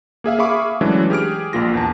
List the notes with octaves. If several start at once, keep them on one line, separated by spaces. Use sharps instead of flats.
A#3 G#4 E5 F5
G#4 E5 F5 B5 C#6 D6
E3 F#3 G#3 A3 C#4 D4
G4 G#4 F6 D7
A#1 A#3 F4 A#6
E2 A5